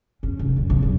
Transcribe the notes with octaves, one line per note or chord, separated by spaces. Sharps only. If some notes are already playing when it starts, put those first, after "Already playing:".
C#4
F1
A#1 F#2
B1
E1 F#2